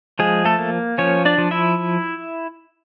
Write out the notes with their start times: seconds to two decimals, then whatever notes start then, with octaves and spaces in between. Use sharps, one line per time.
0.19 F3 G#3 G#4
0.45 A3 A4
0.59 A#3
0.98 F3 C#4 C#5
1.25 D4 D5
1.38 F3
1.51 E4 E5